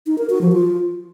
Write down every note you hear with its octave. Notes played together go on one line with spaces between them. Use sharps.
D#4
A#4
F#4
F3
F4